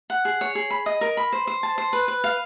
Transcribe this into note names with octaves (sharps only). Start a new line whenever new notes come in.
F#5
G#4
C#5
G#4
B5
D#5
A#4
B5
C5
C5
A5
C5
B4
B4
F5